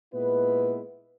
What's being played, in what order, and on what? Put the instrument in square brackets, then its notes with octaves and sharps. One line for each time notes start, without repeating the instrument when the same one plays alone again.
[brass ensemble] A#2 G#3 B3 E4 B4